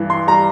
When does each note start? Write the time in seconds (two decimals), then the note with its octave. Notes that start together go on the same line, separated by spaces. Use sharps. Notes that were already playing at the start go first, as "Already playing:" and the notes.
Already playing: G2 E3
0.10 C6
0.27 G3 A#5